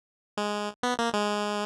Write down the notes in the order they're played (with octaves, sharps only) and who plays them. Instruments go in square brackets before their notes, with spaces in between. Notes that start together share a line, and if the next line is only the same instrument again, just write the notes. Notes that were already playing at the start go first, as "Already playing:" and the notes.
[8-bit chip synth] G#3
B3
A#3
G#3